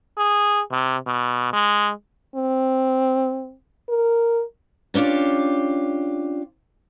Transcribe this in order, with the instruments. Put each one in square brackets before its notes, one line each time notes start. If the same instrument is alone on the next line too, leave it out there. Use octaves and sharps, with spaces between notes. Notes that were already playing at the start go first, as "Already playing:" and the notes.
[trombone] G#4
C3
B2
G#3
[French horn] C4
A#4
[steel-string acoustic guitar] B3 C#4 D4 F4 G4